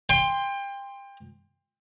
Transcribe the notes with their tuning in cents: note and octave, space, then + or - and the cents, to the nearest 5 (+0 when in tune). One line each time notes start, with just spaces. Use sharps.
G5 +30 C6 +0